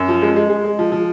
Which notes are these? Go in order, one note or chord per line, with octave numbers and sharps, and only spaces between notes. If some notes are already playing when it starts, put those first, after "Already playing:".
Already playing: F#2
F3
G#3
G#3
G#3
G#3
F3
F3